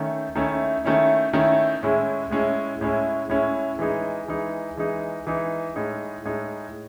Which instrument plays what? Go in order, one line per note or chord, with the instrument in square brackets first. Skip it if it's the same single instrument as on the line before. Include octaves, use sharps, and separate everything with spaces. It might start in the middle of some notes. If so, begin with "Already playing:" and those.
Already playing: [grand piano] D#3 A3 C#4
D#3 A3 C#4 E4
D#3 A3 C#4 E4
D#3 A3 C#4 E4
A2 G#3 C#4 E4
A2 G#3 C#4 E4
A2 G#3 C#4 E4
A2 G#3 C#4 E4
E3 G#3 D#4
E3 G#3 D#4
E3 G#3 D#4
E3 G#3 D#4
A2 G#3 D#4
A2 G#3 D#4